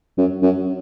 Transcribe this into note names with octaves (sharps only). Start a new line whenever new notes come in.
F#2
F#2